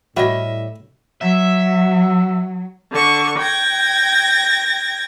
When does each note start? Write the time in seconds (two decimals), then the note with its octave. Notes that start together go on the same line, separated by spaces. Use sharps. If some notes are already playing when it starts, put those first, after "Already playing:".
0.17 A2 G3 F#4 C#5 D#5 E5
1.21 F#3 E5
2.92 D3 C#6
3.37 G5 G#6 A#6